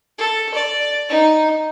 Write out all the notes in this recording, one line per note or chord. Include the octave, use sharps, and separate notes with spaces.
A4
D5
D#4